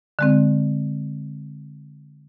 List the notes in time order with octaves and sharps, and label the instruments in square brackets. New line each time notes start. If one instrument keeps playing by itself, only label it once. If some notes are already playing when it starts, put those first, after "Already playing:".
[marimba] D3 G#3 C4